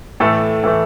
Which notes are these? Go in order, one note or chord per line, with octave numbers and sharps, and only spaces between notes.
A2 E3 A3 A4
A2 E3 A3